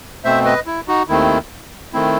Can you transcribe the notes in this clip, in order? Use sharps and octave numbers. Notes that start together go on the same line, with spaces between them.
B2 A3 C4 C5 E5
B4 D#5
E4
D#4 F#4
D#2 D#3 A3 C4 E4
D#3 A3 C4 E4